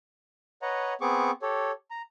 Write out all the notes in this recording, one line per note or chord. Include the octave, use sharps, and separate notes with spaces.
B4 C#5 D#5 F#5 A#5
B3 C4 G#4 C#6 D6
G4 A4 C#5
A#5